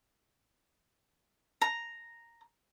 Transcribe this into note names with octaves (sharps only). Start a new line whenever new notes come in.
A#5